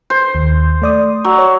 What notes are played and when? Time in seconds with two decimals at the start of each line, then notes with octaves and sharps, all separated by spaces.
0.10 C5
0.35 D#2
0.82 A3 D5 D#6
1.24 F#3
1.38 C#5